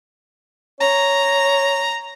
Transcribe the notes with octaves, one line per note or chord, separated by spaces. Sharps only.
C#5 A#5